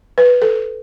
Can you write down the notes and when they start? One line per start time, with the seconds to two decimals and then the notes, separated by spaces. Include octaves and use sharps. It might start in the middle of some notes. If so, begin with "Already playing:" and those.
0.18 B4
0.42 A4